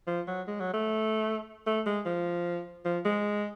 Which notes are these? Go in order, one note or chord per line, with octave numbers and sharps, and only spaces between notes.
F3
F#3
G#3
F#3
A3
A3
G#3
F3
F3
G#3